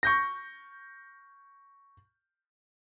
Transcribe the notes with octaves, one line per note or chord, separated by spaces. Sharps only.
C#6 G6 A#6